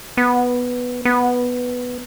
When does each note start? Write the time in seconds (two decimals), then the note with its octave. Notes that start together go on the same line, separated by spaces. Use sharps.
0.17 B3
1.05 B3